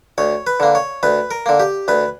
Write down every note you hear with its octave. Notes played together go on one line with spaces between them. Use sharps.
D2 C#5
B4
D3 A#3
C#5
D2 B4
A#4
D3 A#3
G4
D2 B4